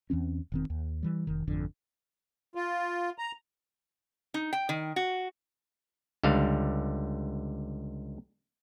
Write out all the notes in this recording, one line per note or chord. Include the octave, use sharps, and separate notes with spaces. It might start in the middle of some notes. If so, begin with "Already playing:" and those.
E2 E3 C4 C#4
E1 D#3 C4
D#2
E3 G3
F1 D#3
G#1 F2 D3
F4
A#5
D#4
G5
D#3
F#4
C#2 D3 G3 F5